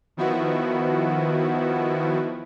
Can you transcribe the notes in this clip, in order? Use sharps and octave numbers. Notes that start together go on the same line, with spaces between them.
D#3 F3 B3 E4 F#4